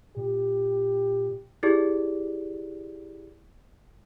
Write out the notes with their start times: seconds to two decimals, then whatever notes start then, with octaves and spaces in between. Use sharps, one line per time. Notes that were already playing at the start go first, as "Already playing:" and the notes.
0.16 A#2 G4
1.63 E4 G4 G#4 D5